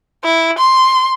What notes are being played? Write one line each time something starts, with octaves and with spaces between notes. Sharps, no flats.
E4
C6